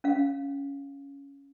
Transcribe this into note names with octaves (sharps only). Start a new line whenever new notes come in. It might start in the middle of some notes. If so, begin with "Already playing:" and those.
C#4 F5